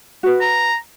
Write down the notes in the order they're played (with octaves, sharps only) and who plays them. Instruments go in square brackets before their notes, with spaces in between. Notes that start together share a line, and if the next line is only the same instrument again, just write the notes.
[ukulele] F#4 B4
[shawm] A#5